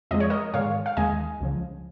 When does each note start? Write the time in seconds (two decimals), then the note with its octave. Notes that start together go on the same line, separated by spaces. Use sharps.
0.11 F2 F3 G#3 D#5
0.20 C#5
0.30 A#4 D#5
0.54 G#2 D#3 G#3 C#5 F5
0.86 F5
0.97 D#2 D#3 G#3 D#5 G#5
1.41 C#2 C#3 F3